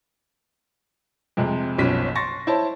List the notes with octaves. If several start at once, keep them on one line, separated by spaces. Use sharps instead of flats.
F2 C3 G#3
F#1 B1 F3 C#4 B6
C6 C#6 A6 A#6
E4 C5 C#5 A5